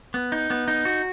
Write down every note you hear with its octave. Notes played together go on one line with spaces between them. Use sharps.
B3
D#4
B3
D#4
F#4